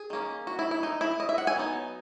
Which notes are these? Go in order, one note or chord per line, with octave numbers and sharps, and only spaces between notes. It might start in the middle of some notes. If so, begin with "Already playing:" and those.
Already playing: G#4
D#3 A#3 C#4
F#4
E4
E4
D#4
E4
D#5
E5
F#5
G#5
F#3 B3 D#4